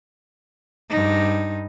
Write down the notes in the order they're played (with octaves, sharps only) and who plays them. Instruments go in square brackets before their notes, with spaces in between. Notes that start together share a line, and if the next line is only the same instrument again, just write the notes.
[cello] G2 D#4